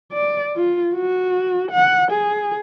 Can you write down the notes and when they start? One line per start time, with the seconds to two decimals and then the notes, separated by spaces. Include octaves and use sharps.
0.12 D5
0.56 F4
0.95 F#4
1.71 F#5
2.11 G#4